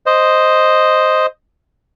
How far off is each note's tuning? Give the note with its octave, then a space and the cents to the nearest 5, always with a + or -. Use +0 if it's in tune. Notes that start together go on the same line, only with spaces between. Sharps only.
C5 +0 D#5 +0